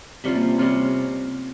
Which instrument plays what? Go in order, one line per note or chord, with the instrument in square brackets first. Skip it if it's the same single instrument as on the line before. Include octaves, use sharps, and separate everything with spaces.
[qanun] C3 G3 C#4 F4 [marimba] C4
[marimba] A#3
[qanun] C3 G3 C#4 F4 [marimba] C4